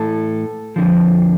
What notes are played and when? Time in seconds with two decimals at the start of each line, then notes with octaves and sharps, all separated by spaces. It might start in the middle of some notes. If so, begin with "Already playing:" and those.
Already playing: A2 E3 A4
0.76 F2 D3 F3